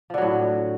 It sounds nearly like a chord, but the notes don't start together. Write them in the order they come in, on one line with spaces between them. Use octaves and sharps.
F3 D3 F#3 A2